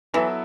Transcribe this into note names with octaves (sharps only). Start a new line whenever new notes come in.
E3 F#3 B3 E4 A4 E5